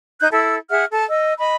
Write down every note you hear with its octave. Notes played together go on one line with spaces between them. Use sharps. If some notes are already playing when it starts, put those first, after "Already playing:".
D#4 F#6 G6
E4 A4 E6
G#4 E5 F#5 F6
A4 A5
D#5 E6
D#5 B5